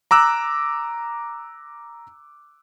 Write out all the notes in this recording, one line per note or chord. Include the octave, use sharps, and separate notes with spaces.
A#5 D6 E6 F#6